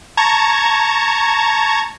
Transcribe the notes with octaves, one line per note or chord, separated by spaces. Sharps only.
A5 A#5 C#6 G#6